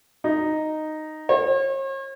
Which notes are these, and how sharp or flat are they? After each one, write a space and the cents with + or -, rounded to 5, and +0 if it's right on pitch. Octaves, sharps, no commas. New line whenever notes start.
D#4 -5
C#5 -45